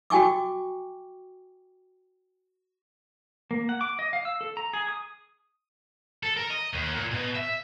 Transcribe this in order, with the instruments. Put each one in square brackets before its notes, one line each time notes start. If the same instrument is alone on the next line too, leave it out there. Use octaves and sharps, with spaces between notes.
[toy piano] F#4 G5 G#5 C#6 D6
[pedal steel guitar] A#3
F#5
D6
D#5
F5
E6
A4
A#5
G#4
D#6
[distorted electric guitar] A4
A#4
D#5
D#2
A#2
B2
E5